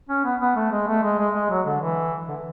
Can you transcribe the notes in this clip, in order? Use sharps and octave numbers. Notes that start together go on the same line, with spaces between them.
C#4
B3
B3
A3
G#3
A3
G#3
G#3
G#3
F#3
D3
E3
D3